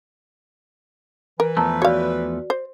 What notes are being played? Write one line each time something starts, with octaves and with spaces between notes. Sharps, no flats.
E3 A#4 B4
E2 F3 A3 A5 A#5
F#4 C#5 D5 F5
C5